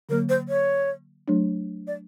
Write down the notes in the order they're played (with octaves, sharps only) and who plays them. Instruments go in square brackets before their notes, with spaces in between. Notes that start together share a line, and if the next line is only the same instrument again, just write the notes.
[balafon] D3 F#3 A#3 [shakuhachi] A#4
[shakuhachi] C5
C#5
[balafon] F#3 A3 D4
[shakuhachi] D5